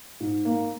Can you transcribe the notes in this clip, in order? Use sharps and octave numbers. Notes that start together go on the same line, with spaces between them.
G#2
A#3